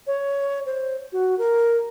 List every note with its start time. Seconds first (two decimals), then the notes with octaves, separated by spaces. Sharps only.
0.07 C#5
0.66 C5
1.12 F#4
1.38 A#4